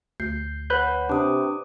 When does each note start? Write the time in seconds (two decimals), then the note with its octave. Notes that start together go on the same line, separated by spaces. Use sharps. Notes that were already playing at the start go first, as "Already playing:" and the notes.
0.20 D2 G6 C7
0.70 B4 C#5 F#5 F#6 G6
1.09 C3 D4 D6 D#6